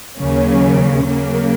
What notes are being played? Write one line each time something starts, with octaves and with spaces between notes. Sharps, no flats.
D#2 C#3 F#3 A#3 C#4
C#3 F#3 A#3